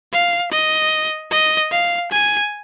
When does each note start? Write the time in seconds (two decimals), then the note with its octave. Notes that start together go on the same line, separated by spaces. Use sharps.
0.13 F5
0.52 D#5
1.32 D#5
1.72 F5
2.11 G#5